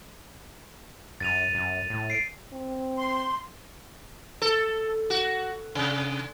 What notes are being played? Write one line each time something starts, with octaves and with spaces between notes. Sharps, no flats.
F#2 A6 D#7 F7
F#2
A2
C7 D7
C4
C6
A4
F#4
C3